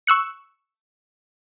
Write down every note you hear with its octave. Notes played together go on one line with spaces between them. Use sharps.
C#6 E6 F#6 C#7